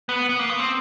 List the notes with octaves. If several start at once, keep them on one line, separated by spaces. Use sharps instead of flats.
B3
B3
A#3
B3
C4